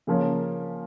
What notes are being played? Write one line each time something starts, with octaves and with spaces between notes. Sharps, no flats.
C#3 F3 A#3 C#4